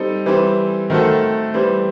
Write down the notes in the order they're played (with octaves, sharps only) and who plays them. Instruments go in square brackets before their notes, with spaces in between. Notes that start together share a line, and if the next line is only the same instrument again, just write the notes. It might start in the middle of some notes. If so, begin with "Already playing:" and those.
Already playing: [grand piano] G3 C4 D#4 A4
E3 G3 C4
D#3 A3 C4 F#4 A4
E3 G3 C4